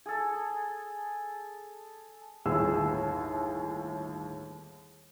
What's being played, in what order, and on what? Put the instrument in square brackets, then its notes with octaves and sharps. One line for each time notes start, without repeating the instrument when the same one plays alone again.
[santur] G#4 A4
[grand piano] G1 D#2 A2 G#4 E6